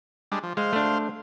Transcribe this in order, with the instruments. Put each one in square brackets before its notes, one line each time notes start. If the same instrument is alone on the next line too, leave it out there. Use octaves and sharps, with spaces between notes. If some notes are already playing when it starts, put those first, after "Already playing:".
[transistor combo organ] G3 G#3 D4
F3
[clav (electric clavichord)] G#3 [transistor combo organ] C5 F5
[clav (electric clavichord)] A3 D4